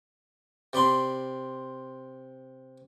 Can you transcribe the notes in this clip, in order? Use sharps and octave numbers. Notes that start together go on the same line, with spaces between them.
C3 D5 B5 C6